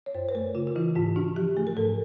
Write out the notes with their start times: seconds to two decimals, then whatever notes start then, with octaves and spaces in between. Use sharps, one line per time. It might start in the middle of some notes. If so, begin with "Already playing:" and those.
0.06 C#5
0.15 F#2 C5
0.29 B4
0.35 A3 A#4
0.55 C#3 F4
0.67 F4
0.76 E3 E4
0.96 G#2 F4
1.16 D4 F#4
1.36 F3 G4
1.57 A3 G#4
1.67 A#4
1.77 G#2 A4